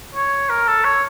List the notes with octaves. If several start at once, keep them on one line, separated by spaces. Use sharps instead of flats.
C#5
A#4
A4
C#5